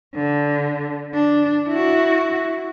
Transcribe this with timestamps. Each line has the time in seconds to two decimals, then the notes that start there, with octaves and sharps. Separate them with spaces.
0.15 D3
1.14 D4
1.69 E4 F#4